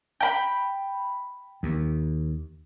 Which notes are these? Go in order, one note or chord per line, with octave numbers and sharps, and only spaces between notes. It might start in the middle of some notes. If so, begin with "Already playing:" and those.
G5 B5
D#2